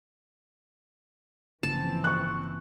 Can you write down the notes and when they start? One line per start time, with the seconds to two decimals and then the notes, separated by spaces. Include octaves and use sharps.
1.63 G1 C#3 E3 F3 A#3 C4 A5
2.04 C#6 F#6